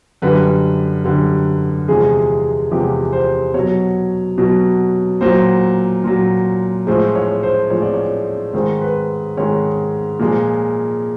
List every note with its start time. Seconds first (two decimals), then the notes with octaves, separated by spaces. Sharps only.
0.22 F#2 D3 G3 B4
1.04 F#2 D3 G3
1.88 E2 C3 F3 G#3 G#4
2.71 E2 C3 F3 G#3 G4
3.13 C5
3.54 B2 F#3 C#5
4.38 B2 F#3
5.21 A#2 F#3 C5
6.04 A#2 F#3
6.87 A2 F3 G#3 C5
7.15 C#5
7.43 C5
7.70 A2 F3 G#3 C#5
7.82 D5
7.94 C#5
8.54 G#2 D#3 G#3 C5
8.82 B4
9.37 G#2 D#3 G#3 C#5
10.19 A#2 F3 G#3